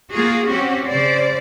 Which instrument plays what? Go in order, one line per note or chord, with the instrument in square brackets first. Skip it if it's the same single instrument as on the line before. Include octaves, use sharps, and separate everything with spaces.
[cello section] A#3 F4 F#4 G#4
C4 C#4 F#4 G4
C#3 C5 D5